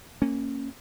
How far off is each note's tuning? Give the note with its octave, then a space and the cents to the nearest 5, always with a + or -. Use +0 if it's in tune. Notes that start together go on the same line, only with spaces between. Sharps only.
A#3 -20 C#4 -15